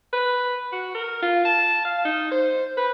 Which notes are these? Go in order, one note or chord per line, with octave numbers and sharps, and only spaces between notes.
B4
F#4
A#4
F4
A5
F5
D#4
C5
B4